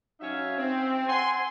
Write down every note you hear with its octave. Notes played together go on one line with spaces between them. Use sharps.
F#3 C#4 D#4 C#5 E5 F5
C4
F#5 G#5 C6